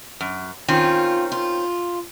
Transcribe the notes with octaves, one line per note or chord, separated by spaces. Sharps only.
F#2
D#3 C4 C#4 F4
F4